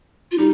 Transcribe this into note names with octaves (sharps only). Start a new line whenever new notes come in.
F4
G3 D#4